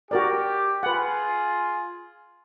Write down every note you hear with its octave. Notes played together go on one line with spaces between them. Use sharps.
F#4 G4 A#4 D5
F4 G#4 B4 F#5